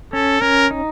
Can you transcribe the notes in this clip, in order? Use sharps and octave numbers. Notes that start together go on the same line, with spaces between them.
C#4 A4
C#4 A#4
D#4